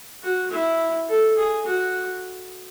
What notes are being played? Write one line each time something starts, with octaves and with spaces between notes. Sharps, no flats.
F#4
E4
A4
G#4
F#4